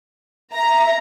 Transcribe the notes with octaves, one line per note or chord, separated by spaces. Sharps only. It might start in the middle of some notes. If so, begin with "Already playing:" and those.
E5 A#5